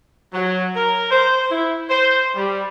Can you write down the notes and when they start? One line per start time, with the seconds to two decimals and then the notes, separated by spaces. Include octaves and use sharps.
0.33 F#3
0.75 A#4
1.11 C5
1.50 E4
1.90 C5
2.36 G3